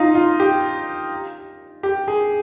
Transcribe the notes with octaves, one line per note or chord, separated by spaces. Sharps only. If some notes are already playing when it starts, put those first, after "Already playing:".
Already playing: D#4 F4
F4
G4
G4
G#4